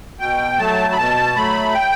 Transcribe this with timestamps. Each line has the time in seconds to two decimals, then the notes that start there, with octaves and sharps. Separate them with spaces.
0.20 B2 G5
0.59 F#3 A3 A5
0.93 B5
0.98 B2 A5
1.36 F#3 A3 B5
1.74 G5